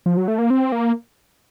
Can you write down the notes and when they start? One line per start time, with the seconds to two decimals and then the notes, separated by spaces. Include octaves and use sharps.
0.06 F3
0.17 F#3
0.28 A3
0.38 A#3
0.50 C4
0.72 A#3